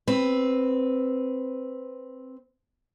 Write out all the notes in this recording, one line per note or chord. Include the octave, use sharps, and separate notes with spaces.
C4 B4